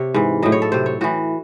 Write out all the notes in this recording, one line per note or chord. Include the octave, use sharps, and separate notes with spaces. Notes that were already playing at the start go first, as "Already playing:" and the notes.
Already playing: C3 C#5
G#2 E3
A2 F#3 D#5
C#5
A4
C3 F#3 C5
C#5
A2 E3 F#4